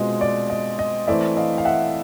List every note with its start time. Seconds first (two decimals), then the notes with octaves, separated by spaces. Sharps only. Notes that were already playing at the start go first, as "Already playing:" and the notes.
Already playing: B2 G#3 C4 F4 D#5
0.21 D5
0.50 D#5
0.79 D#5
1.07 E3 A3 C4 D5 E5
1.37 D#5 F5
1.58 F5
1.65 E5 F#5